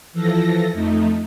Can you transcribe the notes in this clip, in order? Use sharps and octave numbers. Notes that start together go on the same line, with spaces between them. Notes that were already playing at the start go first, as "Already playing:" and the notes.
E3 F3 A4 A#6
F2 A3 D#4